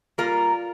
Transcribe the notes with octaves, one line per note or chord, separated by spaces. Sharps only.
A#2 G3 A#3 F4 A#4